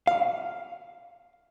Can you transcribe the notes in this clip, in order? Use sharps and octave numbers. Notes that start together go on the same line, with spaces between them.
F5